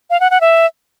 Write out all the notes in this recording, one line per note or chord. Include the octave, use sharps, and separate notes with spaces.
F5
F#5
F#5
E5